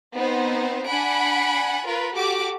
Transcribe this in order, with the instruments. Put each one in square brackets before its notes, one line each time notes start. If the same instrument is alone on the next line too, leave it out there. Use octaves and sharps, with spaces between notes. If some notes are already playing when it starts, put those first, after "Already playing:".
[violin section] B3 C4 D#4 C5
D4 F#5 G#5 B5 D7
F4 A#4 B4
F#4 G4 A4 D6